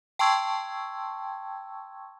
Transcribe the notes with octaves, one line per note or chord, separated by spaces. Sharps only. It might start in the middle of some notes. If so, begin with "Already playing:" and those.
G5 A5 C6 C#6 E6 G#6